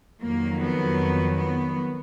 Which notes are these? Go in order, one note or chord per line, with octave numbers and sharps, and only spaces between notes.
F2 D#3 F#3 A#3
B3
B3